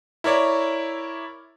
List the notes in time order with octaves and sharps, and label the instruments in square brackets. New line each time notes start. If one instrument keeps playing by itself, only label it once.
[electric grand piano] E4 A#4 C#5 D5